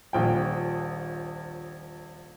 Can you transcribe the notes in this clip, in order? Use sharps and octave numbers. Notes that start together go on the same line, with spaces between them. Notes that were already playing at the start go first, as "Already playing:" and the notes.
D#1 A#1 G5